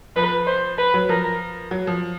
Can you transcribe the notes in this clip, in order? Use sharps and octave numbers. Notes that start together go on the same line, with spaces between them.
F3 B4
C5
B4
F#3
F3 A#4
F#3
F3